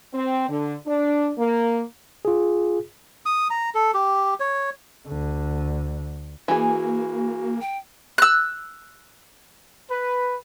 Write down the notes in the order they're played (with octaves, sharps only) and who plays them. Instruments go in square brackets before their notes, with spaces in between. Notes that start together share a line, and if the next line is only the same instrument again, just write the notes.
[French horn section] C4
D3
D4
A#3
[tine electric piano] F4 G#4
[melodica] D#6
A#5
A4
G4
C#5
[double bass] D2 D3
[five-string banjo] E3 G#4 [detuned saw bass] A#3 [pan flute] F#4
[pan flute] G5
[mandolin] E6 F#6
[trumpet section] B4